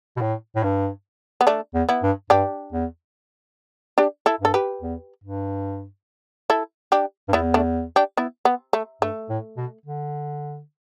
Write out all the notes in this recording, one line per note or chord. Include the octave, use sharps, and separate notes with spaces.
B2
A2
A2
G2
B3
A3 D4
E2
B3 E4
G2
G2 D4 G4
E2
D4 G4
E4 A4
G2 A4
G4 B4
E2
G2
E4 A4
D4 G4
G2
E2 B3 E4
A3 D4
D4 G4
B3 E4
B3
A3
G2 A3
A2
B2
D3